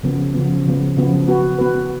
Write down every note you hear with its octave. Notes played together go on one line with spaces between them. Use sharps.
C#3 F3 B3
C#3 F3 B3
C#3 F3 B3
C#3 F3 B3
B3 F#4 B4
B3 F#4 B4